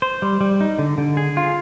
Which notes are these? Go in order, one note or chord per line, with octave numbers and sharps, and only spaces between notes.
C5
G3
G3
D#4
D3
D3
G#4
F4